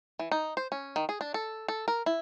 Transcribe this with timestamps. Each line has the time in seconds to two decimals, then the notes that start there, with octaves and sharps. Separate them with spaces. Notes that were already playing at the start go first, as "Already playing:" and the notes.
0.19 E3
0.32 D#4
0.57 C5
0.72 C#4
0.96 D#3
1.09 G#4
1.21 D4
1.34 A4
1.68 A4
1.88 A#4
2.06 E4